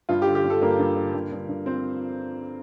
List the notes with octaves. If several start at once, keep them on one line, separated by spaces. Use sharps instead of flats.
G2 F4
G4
D3
G4
G2
A4
G2 A#3 A#4
G2
D3
G2
G2
G2
F3 C4 C5